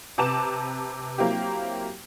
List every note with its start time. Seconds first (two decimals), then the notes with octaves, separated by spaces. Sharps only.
0.18 C3 B4 A5 A#5 D6 E7
1.18 F#3 A#3 C4 E4 G4